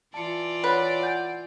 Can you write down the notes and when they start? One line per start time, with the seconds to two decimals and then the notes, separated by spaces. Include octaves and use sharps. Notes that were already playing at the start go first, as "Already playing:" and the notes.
0.14 E3 F4 D5 A5 C#7
0.64 B4 C#5 F#5
1.03 F#5 G#5 G6